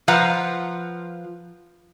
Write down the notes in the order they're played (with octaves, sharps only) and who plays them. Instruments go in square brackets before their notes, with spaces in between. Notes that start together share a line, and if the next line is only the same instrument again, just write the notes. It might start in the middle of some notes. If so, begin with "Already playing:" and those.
[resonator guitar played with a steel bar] F3 F4 B4 F5 F#5 A#5